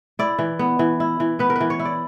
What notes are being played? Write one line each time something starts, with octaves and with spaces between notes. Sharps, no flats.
E4 D5
E3
B3
E3
E4
E3
B3 B4
A#4
B4
E3
C#5
E4
D5